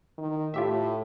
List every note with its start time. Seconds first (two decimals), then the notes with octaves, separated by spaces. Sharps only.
0.18 D#3
0.54 A2 F4 G4 E5